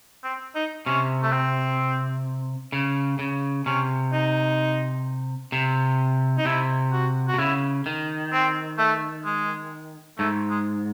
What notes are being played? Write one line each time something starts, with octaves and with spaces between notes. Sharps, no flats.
C4
D#4
C3 C#4
A3
C4
C#3
C#3
C3 C#4
D#4
C3
D#4
C3 E4
F#4
F#4
C3
C#3 E4
D#3
C4
A3
G#3
G#2 A3
G#3